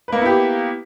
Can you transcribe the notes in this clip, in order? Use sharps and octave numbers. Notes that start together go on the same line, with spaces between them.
A#3 B3 E4 G4 B4